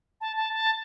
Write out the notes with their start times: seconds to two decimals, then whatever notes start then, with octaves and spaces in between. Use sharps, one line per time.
0.21 A5
0.36 A5
0.53 A5